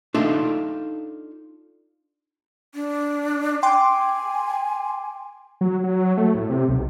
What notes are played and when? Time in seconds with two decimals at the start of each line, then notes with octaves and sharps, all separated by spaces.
0.14 D4 D#4 F4 A4 E5 A5
2.74 D4
3.63 G5 G#5 C6 D6
5.61 F#3
5.84 F#3
6.17 A3
6.34 A2
6.50 C3
6.69 B1